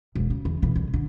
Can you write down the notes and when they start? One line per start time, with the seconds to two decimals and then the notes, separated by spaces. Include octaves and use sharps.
0.15 E1 D#2
0.30 C#3
0.45 E2
0.62 B1 E3
0.75 C2
0.94 D3